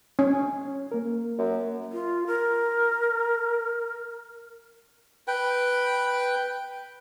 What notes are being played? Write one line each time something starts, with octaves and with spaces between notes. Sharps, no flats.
C#4
A#3 A#4
F#2
F4
A#4
B4 G5